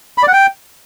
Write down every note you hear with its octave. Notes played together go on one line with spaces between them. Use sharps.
B5
D5
F#5
G5